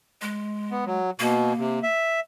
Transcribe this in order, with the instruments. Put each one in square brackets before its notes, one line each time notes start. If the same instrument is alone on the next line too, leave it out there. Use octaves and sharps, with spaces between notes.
[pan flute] G#3
[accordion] B3
F#3
[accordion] B2 [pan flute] A#3
[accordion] C3
E5